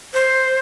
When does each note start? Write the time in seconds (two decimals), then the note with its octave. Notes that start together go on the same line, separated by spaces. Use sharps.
0.14 C5